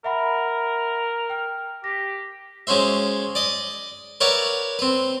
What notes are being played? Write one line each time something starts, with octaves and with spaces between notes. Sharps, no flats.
A#4 E5 F#5 B5
G5 F6
G4 A#6 B6
G#3 C#4 F#4 C5 E5
D5 D#5
A#4 B4 C#5 D5 E5 F#5
C4 B4